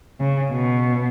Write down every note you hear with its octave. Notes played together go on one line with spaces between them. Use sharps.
C#3
B2